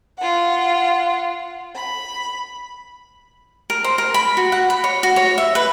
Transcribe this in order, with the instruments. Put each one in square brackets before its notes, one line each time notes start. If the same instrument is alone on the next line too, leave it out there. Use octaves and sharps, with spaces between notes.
[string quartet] F4 F#5
B5
[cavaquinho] A#4
C5
A#4
B5
F#4
F#5
B5
C#5
F#4
C#5
E5
B4